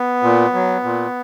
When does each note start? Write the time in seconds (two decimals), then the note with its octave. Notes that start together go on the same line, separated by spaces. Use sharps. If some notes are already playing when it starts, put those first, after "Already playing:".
Already playing: B3
0.23 A#2
0.54 F#3
0.83 A#2